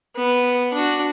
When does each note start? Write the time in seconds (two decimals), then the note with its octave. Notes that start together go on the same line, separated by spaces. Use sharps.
0.16 B3
0.73 D4 F#4